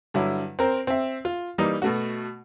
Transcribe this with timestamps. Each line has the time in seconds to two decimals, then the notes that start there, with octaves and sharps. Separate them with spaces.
0.14 G2 D3 F#3 E4
0.59 C4 A#4 C5
0.87 C4 E5
1.25 F4
1.58 E3 G3 A#3 D#4
1.82 B2 A3 F#4